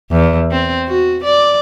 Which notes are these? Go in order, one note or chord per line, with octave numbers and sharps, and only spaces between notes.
E2
C4
F#4
D5